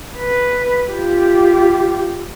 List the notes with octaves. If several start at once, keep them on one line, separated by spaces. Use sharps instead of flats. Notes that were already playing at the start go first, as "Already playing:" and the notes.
B4
F4 G4